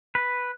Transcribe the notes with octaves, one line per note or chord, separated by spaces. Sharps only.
B4